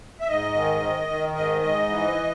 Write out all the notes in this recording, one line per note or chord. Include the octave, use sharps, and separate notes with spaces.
E5
G#2 D#5
D#3
D#3
D#3
G#2 D#5
G#2 D#5
E3